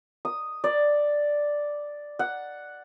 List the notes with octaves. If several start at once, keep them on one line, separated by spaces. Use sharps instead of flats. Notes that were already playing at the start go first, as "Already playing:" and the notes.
D#6
D5
F#5